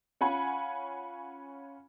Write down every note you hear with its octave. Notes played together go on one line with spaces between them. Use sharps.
C#4 F4 F#5 G#5 B5